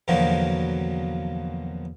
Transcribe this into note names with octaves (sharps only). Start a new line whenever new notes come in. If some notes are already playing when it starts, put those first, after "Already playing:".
E2 B2 D3 F3 F#3 A#3